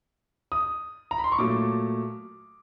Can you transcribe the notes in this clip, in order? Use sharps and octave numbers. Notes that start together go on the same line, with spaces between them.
D#6
A#5
B5
C6
C#6
A#2 F#3 A3 D6